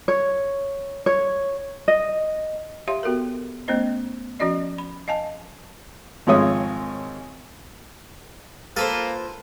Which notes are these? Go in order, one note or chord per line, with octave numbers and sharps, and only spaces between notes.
C#5
C#5
D#5
G4 C#5 E5 F5 C6
B3 F#4 A4 A#4
A3 B3 C#4 C5 D#5
F3 C#4 F#4 D5 D#5
B5
D#5 F5 G#5 A5
G#1 F3 G#3 C#5 D#6
A#3 F4 A4 B4 C5